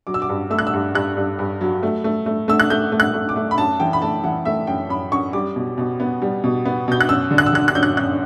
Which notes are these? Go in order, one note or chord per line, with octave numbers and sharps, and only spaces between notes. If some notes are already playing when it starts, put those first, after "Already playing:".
F#3 D6
E6
D6
G2
A3 E6
F#6
E6
G2
G2 F#6
G2
G2
F#3
A3
A3
A3
A3 E6
F#6
A3 G6
A3
F#6
A3
D6
A3
B5
F#2 A5
E3 G5
B5
A3 A5
E3 F#5
A3 E5
F#2 G5
F#2 B5
F#2 C#6
G3 D6
B2
B2
B3
G3
B2
B3
B2 G6
F#6
F#2 E6
D3
F#6
E6
D3 F#6
F#6
F#2 G6
F#6
F#2 F#6